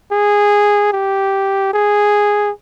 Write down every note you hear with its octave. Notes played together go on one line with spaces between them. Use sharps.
G#4
G4
G#4